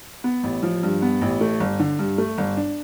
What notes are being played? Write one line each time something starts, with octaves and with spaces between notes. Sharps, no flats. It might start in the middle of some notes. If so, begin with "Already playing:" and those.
B3
A1
F3
G2
B3
A1
A3
G1
D3
G2
A3
G1
D4